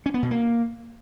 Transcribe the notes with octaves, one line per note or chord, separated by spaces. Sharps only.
C#4
B3
B2
A#3